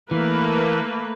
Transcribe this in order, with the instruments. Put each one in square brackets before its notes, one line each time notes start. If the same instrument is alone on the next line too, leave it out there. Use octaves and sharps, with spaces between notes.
[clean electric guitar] E3 [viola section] A3 A#3 B4